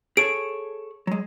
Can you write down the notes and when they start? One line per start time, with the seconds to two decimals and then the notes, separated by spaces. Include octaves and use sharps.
0.17 G#4 A4 C#5 D7
1.07 F#3 G#3